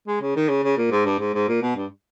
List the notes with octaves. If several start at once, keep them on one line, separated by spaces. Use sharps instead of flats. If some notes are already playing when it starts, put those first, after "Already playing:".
G#3
C#3
D#3
C#3
C#3
A#2
G#2
G2
G#2
G#2
A#2
B2
G2